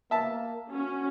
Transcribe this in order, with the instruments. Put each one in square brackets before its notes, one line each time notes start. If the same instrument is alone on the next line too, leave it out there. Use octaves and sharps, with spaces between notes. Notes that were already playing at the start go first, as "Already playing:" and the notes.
[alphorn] A#3 [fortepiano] E5 A5
[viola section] C#4 [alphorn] F#4